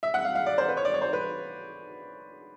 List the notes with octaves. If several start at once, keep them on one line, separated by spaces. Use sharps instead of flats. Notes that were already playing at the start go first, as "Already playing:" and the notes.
E5
F#5
F5
F5
D5
C5
B4
C#5
D5
C#5
C5
B4